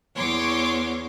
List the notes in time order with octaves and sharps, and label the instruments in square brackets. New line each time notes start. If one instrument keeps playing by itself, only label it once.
[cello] E2 [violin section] C#5 C6 D6